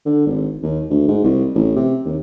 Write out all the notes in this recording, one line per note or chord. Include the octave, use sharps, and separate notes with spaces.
D3
G#1
D#2
D2
G#2
C2
A1
C3
D#2